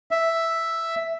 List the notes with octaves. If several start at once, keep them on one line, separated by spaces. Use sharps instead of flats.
E5